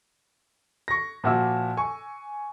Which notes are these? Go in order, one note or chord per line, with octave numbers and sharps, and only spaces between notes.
C#6 A#6
A#2 F3 F#4 E5 D6 E6
G#5 C#6